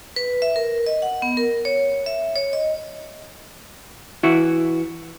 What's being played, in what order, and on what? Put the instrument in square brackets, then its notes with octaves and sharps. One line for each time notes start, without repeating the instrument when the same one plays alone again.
[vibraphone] B4
E5
A#4
D#5
F#5
B3
A#4
C#5
E5
C#5
D#5
[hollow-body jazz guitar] E3 E4 F#4